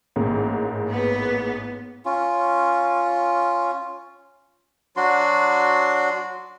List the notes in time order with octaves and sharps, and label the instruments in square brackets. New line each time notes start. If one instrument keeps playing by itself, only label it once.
[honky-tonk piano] A1 G#2 A#3
[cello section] B3
[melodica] C#4 F4
F#3 D4 F#4 C6